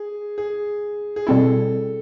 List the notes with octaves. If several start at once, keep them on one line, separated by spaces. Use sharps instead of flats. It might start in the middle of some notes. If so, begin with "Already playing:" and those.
Already playing: G#4
G#4
G#4
B2 G3 C4 E4 A4